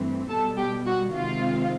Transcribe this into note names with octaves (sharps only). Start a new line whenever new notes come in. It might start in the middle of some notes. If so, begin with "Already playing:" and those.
Already playing: G2 E3 A3 C4
B2 G3 B3 A4 A5
G4 G5
F#4 F#5
C3 D#3 G#3 C4 F4 F5